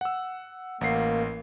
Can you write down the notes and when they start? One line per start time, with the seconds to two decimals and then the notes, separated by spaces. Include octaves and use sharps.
0.01 F#5 E6
0.81 A1 A#3 F#5 C7